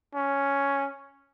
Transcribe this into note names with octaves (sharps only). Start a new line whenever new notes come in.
C#4